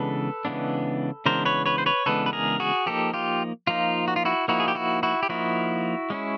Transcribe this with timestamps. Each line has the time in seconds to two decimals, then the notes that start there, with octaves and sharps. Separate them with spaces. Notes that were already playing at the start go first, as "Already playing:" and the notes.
Already playing: C#3 E3 G#3 B3 D4 A4 B4
0.45 C#3 E3 G#3 B3 D4
1.26 C#3 E3 G#3 B3 D4 A#4 C5
1.45 B4 C#5
1.66 B4 C#5
1.78 C5
1.86 B4 C#5
2.06 C#3 E3 G#3 B3 D4 A4 B4
2.26 B4
2.33 G#4 A#4
2.60 F#4 G#4
2.86 F3 A#3 D#4 G4 A4
3.14 F4 G4
3.67 F3 A#3 D#4 F4
4.08 F#4
4.16 F4
4.25 E4 F#4
4.48 F3 A#3 D#4 E4 F#4
4.60 G#4
4.68 G4
4.75 E4 F#4
5.03 E4 F#4
5.23 G4
5.29 F3 A#3 D#4 E4 F#4
6.10 G#3 C#4 E4